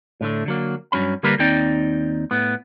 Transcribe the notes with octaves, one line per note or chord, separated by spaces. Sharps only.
A2 D3 A3
D3 F#3 A#3
G2 F#3 C#4 B5
D3 G3 A#3 G4 A#4 B4
D#2 C4 D#4 D5 G5
A2 B3